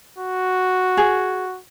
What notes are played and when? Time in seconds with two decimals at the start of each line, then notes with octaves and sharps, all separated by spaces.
0.18 F#4
0.97 G#4